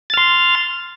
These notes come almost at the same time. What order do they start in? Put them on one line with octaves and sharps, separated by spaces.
A6 F6 C6